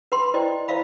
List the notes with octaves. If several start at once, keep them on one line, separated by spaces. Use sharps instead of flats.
B4 F#5 B5 C6
E4 C5 D5 D#5 G5
E4 C5 D5 E5 F5 B5